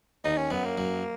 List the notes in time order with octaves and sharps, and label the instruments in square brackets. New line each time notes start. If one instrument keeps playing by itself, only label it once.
[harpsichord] D#2 D#3 [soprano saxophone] D#4
[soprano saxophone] C#4
[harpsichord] F#2 F#3 [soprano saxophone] B3
[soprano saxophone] A#3
[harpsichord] F#2 F#3